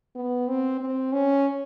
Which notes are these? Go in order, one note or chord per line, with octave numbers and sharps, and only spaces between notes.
B3
C4
C4
C#4